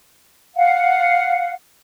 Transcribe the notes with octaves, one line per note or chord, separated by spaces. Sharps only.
F5 F#5